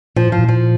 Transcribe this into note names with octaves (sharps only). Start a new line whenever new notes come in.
A#2 F3
A2 F3
A#2
F3